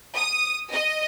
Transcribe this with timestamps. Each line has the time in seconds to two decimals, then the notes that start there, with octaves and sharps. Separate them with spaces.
0.15 D#6
0.71 D#5